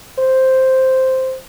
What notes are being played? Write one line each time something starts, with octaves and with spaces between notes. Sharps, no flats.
C5